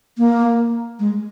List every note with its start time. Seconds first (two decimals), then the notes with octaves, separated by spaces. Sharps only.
0.18 A#3
0.99 G#3